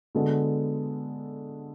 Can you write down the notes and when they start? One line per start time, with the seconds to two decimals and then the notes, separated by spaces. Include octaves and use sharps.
0.15 D3 G#3 B3 F#4 A4